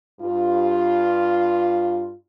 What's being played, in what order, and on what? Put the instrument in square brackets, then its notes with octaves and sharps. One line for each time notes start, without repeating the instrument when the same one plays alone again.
[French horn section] G2 F4